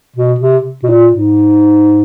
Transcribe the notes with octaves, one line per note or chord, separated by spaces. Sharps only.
B2
C3
B2
A#2
G#2